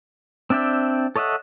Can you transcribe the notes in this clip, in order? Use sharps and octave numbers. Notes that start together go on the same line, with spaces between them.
C4 D4 D5 E5 G5
A4 C#5 D#5 E5 F#5